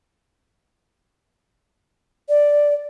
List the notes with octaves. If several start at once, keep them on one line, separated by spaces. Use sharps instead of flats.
D5